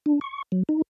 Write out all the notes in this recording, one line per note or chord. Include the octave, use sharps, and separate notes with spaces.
D4
C#6
F#3
D#4